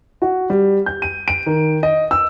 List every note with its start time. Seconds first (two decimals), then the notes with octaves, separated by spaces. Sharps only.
0.22 F#4
0.50 G3
0.86 G6
1.02 D#7
1.28 D7
1.46 D#3
1.83 D#5
2.11 E6